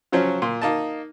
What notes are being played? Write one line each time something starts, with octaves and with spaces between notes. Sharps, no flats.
C#3 F3 F#3 C#4 C5
A#2 C6
A#3 D#4 A5